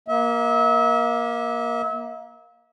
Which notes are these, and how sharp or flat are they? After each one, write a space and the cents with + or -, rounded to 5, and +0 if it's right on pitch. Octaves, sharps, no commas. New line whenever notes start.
A#3 +20 E5 -35